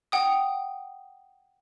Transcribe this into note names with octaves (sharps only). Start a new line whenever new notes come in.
F#5 G5 D#6